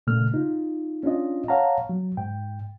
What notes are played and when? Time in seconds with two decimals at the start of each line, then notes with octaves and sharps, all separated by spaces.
0.07 A#2 C#3 A3 F6
0.34 D#4 F4
1.03 C#4 D4 F4 D#5
1.48 C#5 F5 F#5 A5 A#5
1.89 F#3
2.17 G#2 G5